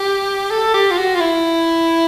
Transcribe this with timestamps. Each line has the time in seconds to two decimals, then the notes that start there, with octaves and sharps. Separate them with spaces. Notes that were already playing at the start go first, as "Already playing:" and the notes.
Already playing: G4
0.50 A4
0.74 G4
0.91 F4
0.97 F#4
1.15 F4
1.21 E4